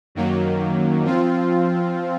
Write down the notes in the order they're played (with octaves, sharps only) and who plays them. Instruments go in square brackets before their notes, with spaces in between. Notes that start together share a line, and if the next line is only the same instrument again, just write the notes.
[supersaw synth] F#2 D#3 F#3 A#3
F3 C4 F4